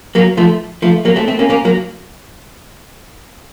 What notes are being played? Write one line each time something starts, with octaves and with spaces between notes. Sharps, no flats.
F#3 A#3
F3 A3
F3 A3
F#3 A#3
A3 C4
A3 C4
A#3 C#4
A#3 C#4
F#3 A#3